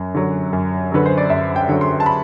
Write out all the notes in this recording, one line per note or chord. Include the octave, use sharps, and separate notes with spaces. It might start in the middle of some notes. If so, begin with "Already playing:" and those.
Already playing: F#2
D3 F#3
F#2
D3 F#3 B4
C5
D5
F#2 E5
G5
D3 F#3
C6
A5
B5